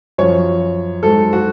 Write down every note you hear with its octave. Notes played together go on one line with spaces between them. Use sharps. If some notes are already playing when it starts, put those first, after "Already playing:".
F#2 F3 C#5
G#2 F#3 A4
F#4